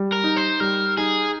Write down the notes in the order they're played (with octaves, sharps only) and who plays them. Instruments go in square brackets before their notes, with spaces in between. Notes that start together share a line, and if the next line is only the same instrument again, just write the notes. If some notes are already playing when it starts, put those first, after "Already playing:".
Already playing: [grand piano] G3
[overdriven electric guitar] A#4
[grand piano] D#4
[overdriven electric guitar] C5
[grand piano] G3 [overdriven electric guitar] A#4
[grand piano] D#4 [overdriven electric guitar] G#4